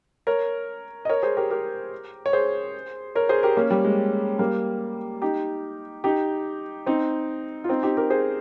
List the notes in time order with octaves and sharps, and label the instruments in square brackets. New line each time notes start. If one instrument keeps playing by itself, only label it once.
[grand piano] A#4 C#5
D#5
A#4 C#5
G#4 C5
G4 A#4
G4 A#4
C#5
G#4 C5
A#4 C#5
G#4 C5
G4 A#4
A#3 C#4
G3
G#3
G3 A#3
D#4 G4
D#4 G4
C4 D#4
F4
C4 D#4
D#4 G4
G4 A#4
G#4 C5